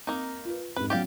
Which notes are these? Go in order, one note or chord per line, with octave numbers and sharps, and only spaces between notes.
A#3 C4 D#4 D#5
F4 B4
F2 G#2 B4
F#3 B3 C#4 G4 D5 F5